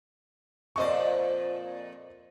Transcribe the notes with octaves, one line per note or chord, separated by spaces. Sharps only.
F2 A#2 C5 D5 D#5 C#6